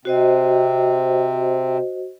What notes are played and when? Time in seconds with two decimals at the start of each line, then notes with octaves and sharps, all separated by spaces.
0.05 C3 C4 F#4 C5 D#5